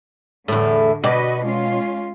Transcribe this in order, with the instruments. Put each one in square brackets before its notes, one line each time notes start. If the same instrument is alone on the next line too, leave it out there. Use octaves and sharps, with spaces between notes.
[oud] E2 A2 [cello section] D3
[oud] B2 D5 [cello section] F#4 B4 D#5
[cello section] G#3 C#4 F4